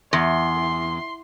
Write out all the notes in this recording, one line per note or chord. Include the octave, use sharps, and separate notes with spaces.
E2 C6